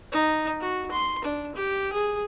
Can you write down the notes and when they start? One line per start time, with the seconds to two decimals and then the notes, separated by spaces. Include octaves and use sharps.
0.12 D#4
0.61 F#4
0.91 C6
1.25 D4
1.55 G4
1.93 G#4